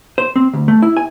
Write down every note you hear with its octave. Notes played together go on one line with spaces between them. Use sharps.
C5
C4
D2
A3
E4
G#5